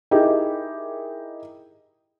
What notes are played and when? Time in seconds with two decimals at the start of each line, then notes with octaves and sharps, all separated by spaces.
0.11 D#4 E4 G4 G#4 A#4